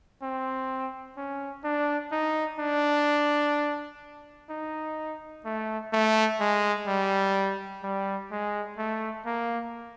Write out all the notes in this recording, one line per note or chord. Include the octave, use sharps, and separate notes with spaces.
C4
C#4
D4
D#4
D4
D#4
A3
A3
G#3
G3
G3
G#3
A3
A#3